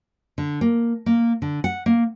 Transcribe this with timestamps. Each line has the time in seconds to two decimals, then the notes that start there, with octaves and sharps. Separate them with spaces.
0.38 D3
0.61 A#3
1.06 A#3
1.42 D3
1.64 F#5
1.86 A#3